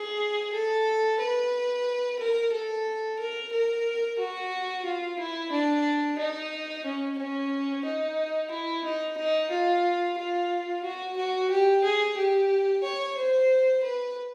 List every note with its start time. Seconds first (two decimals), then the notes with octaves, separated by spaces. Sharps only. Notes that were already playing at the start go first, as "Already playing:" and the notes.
Already playing: G#4
0.53 A4
1.19 B4
2.19 A#4
2.52 A4
3.19 A#4
3.52 A#4
4.18 F#4
4.85 F4
5.19 E4
5.52 D4
6.18 D#4
6.85 C#4
7.18 C#4
7.85 D#4
8.51 E4
8.84 D#4
9.17 D#4
9.51 F4
10.18 F4
10.84 F#4
11.17 F#4
11.51 G4
11.84 G#4
12.17 G4
12.83 C#5
13.17 C5
13.83 B4